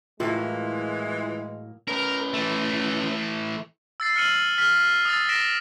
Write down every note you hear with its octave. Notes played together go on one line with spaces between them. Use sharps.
A2 E3 F#3 G#3 A#3 F4
C#4 A#4 B4
E3 A3
E6 A6 C7
F6 C#7 D#7 F#7
F6 B6
D#6 E6 A6
A#6 B6 D7 E7